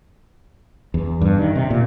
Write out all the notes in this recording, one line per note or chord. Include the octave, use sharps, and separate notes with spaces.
E2
G2
D#3
C3
A#2